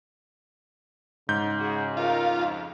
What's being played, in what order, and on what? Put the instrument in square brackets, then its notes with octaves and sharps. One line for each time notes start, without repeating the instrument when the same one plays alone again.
[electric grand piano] G#2 G6 [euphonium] C#3
[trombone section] F#4 G#4
[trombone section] A3 D#4 A#4 [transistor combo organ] F4
[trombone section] F2